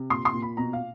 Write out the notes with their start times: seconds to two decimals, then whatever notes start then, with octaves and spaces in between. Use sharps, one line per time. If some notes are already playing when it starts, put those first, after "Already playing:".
Already playing: C3
0.10 A#2 C6
0.25 C6
0.33 A#2
0.42 B5
0.57 B2 A#5
0.73 F5